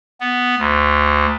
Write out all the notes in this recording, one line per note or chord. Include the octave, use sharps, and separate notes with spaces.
B3
D2